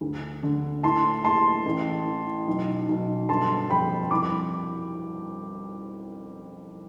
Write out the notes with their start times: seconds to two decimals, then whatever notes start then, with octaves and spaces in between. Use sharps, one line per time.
0.01 D2
0.43 D3
0.83 A2 A5 C6
1.24 A2 A5 C6
1.66 A1
2.06 E3
2.47 B1
2.89 B1
3.29 G1 A5 C6
3.70 F2 G5 B5
4.11 C2 B5 D6